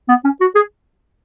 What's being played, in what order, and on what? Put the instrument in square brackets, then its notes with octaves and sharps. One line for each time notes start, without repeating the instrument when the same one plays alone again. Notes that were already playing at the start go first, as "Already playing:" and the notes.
[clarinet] B3
C#4
F#4
G#4